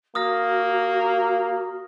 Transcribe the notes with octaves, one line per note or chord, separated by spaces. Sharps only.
A#3 F#4 D#6 F6 A#6